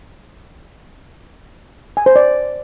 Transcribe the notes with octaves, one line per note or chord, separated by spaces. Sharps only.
G#5
C5
D5